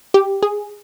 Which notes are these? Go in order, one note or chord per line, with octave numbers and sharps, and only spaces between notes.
G4
G#4